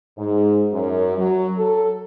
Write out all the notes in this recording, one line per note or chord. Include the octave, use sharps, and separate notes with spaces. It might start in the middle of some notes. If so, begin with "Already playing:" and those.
G#2
F#2
F#3
A4